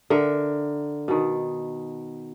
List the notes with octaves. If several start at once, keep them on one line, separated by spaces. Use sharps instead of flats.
D3 A#4 E5
B2 D#3